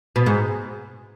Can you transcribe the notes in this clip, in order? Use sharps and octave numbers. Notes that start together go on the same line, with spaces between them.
B2
G#2